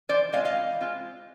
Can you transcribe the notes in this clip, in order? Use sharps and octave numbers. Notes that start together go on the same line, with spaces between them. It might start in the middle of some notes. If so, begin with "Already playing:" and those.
E3 C5 D5
G#3 C4 F4 D#5 F5
D#5 F5
E3
G#3 C4 F4